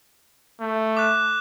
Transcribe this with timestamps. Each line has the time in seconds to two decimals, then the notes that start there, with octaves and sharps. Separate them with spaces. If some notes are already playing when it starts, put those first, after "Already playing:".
0.61 A3
0.97 D6 F#6 E7